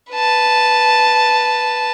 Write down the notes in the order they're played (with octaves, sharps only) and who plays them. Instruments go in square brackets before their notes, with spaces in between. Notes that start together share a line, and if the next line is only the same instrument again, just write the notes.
[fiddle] B4 A5